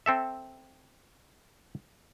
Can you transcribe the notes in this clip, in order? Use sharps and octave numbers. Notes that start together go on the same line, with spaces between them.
C4 A4 E5